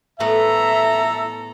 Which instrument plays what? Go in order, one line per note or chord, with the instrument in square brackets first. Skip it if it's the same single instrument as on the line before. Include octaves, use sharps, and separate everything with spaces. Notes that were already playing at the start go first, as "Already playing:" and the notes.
[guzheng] A2 A3 B3 [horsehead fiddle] A4 A#5 [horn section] E5